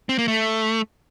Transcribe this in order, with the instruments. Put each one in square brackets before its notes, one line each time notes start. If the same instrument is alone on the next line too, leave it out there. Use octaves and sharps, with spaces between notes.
[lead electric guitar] C4
A#3
A3